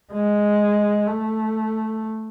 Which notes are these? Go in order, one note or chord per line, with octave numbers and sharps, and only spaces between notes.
G#3
A3